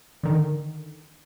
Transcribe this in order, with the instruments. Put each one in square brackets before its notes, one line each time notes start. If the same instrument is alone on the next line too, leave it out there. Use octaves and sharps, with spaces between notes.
[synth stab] D3 D#3